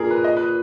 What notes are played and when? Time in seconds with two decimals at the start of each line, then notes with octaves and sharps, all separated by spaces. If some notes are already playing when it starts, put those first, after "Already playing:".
Already playing: A#2 G#4 A#4
0.11 B4
0.24 D#5
0.37 B4